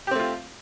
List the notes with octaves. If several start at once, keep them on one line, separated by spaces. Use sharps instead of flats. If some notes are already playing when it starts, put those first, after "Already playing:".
A3 C4 F4 G4